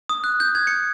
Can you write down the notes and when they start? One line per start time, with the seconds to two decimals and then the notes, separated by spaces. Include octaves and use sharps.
0.09 D#6
0.24 F#6
0.40 G6
0.55 G#6
0.67 C#7